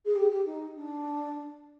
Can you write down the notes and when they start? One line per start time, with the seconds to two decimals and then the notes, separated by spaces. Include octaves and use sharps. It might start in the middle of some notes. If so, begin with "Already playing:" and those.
0.05 G#4
0.15 G4
0.30 G4
0.45 D#4
0.75 D4